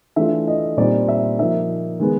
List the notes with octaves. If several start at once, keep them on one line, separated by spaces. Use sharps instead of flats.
E3 A3 D4 F4 E5
D#5
A#2 G3 C4 D#4 D5
E5
F3 A#3 D#4 E5
D#3 G#3 B3